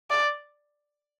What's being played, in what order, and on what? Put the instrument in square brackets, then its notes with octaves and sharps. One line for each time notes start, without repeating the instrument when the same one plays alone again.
[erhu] D5